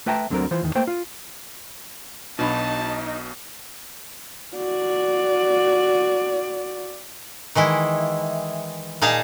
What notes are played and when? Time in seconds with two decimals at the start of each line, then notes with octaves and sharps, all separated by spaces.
0.06 A3 B4 E5 G5 A5 A#5
0.30 D2 D3 F#3 C4 A#4
0.51 E3 F4 C5
0.62 E2 D#3
0.75 A3 A#3 C5 G5
0.87 F4
2.39 B1 B2 D4 D#4 F#4 A5 B5
4.56 F#4 D5
7.55 D#3 E3 G#3 E4
9.01 A#2 D#4 G#4 F5 A5 A#5